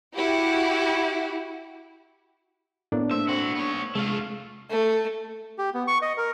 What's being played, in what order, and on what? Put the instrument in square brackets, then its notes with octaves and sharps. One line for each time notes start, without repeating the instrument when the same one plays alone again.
[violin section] E4 F#4 G4
[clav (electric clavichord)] A2 A#3 [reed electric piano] B3 [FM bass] D4
[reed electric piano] A3 A#3 [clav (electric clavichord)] C5 [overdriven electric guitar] E5
[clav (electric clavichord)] C4 [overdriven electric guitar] E4 F#4
[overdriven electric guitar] B3 C#5
[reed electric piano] C3 G#3 G#4 [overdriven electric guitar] A3 F4
[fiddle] A3
[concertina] G4
B3
C#6
D#5
A#4